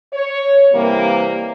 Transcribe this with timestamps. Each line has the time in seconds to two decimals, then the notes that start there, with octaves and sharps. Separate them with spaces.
0.13 C#5
0.73 C3 E3 G3 A#3